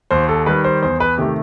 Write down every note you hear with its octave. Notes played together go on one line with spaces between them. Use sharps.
D#2 C5
A4
D#3 G3 B4
C5
E2 C5
B4
C3 D#3 A3 G4